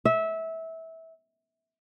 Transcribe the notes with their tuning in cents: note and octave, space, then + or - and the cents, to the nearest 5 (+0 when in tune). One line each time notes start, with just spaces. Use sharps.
E5 -20